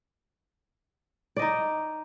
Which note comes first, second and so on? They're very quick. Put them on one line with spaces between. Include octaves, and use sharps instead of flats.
D5 D#5 D#4